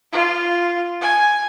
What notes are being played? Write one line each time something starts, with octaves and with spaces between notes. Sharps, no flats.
F4
G#5